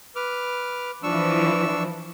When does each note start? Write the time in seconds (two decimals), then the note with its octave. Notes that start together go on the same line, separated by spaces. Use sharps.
0.16 B4 D6 F6
1.03 E3 F3 D4 C#6 E6